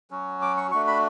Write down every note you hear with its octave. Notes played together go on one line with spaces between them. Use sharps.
F#3 C#4 F#4
D6
C#6
A3 D4 F#4 C#6
B5